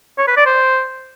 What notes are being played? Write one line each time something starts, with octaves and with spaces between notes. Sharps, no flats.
C#5
B4
D5
C5